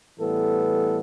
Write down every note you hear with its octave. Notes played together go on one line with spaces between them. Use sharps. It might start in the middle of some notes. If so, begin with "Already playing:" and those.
A2 E3 G3 B3 A4